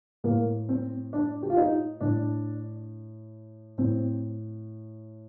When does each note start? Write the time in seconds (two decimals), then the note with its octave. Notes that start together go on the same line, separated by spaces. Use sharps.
0.24 A2 A#3
0.69 C4
1.13 D4
1.43 G4
1.50 F4
1.57 D#4
2.00 A2 D4
3.78 A2 C4